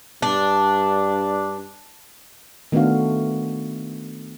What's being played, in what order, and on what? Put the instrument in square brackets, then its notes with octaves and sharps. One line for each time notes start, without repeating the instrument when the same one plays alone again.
[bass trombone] G2 [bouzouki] D4
[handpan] D#3 A3 B3 D4 F#4 F5